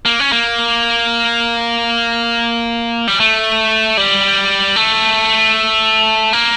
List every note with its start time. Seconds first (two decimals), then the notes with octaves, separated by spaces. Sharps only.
0.06 A#3
0.20 C#4
0.32 A#3
3.08 G3
3.20 A3
3.97 G3
4.76 A3
6.33 A#3